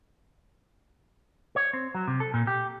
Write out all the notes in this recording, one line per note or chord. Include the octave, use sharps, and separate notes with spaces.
C#5
C4
F#3
C3
A4
A#2
G4